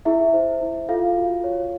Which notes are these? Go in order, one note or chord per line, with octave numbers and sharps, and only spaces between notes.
E4 G#4 E5
C5
E4
F4 A4 F5
F#4
C#5